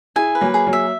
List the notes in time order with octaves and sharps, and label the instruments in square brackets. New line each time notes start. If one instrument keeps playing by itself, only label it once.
[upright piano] E4 G#4 [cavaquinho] G#5
[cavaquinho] B4
[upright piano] F#3 A#3
[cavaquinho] G#4
[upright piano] F#3 A#3
[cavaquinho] E5